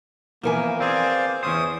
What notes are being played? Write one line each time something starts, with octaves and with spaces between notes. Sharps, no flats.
E3 F3 A#3 B3 A#4 G#5
C4 G#4 C5 D5 F5
E2 C#4 C5 D#6